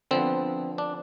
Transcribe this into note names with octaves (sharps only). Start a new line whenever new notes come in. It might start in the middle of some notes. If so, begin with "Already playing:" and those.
D3 F3 B3 C4
D4